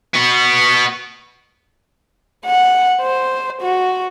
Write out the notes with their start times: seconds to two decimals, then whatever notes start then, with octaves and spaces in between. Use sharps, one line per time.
0.15 B3 F#4
2.46 F#5
3.01 C5
3.62 F#4